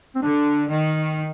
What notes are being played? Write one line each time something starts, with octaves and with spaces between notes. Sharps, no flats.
C4
D3 D4
D#3